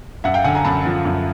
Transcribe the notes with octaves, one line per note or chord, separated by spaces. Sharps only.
F#2 E5 F#5
F5 G5
D3 F#5 G#5
G#5 A#5
F#2 A5 B5
F3
F#2